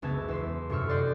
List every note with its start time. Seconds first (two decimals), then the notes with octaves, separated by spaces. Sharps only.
0.02 F#1 C#2 B3 E5 A5 G#6
0.28 E2 E5 C6
0.69 G1 F#2 C3 C#6 E6 F6
0.89 D5 D#5 F#5 C6 G6